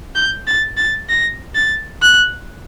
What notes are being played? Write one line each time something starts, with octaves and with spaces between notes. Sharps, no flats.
G6
A6
A6
A#6
A6
F#6